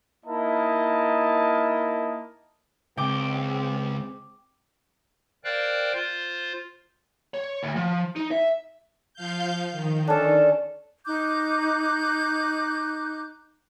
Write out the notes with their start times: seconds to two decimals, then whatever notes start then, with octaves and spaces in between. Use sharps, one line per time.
0.25 A#3 D#4 E4 A#4 D#5 A5
2.97 C#2 G#3 C4 G5 D6
5.44 A#4 C5 D5 F5 G5 F#6
5.94 F4 C5
7.34 C#5
7.63 D2
7.76 F3
8.16 D#4
8.31 E5
9.14 F3 F5 G6
9.72 D#3
10.07 C#4 D4 A4
11.05 D#4 D6 F#6 G6